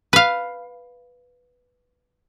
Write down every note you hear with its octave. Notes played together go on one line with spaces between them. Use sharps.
B4 F5